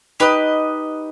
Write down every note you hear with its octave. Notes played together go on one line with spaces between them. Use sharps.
D#4 G4 B4 D#5